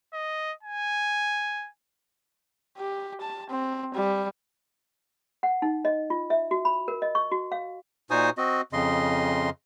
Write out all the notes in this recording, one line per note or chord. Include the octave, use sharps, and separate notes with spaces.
D#5
G#5
G4
A5
C4
G3
F#5
D#4
D#5
F4
E5
F#4
B5
A#4
D#5
C#6
F#4
F5
A#2 D#4 F#4 C5 G#5 D#6
C4 F#4 D#5
F2 C#3 D#5 C6